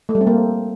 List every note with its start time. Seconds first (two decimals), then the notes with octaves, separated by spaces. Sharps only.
0.09 A3
0.15 G3
0.21 C4
0.27 A#3